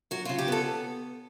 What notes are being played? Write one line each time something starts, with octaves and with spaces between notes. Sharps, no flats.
F#3 F#4
C#3 F4
G4
B3 A4